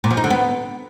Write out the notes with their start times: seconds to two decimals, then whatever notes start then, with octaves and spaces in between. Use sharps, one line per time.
0.04 A#2
0.11 F3
0.17 D#4
0.24 D3
0.30 B3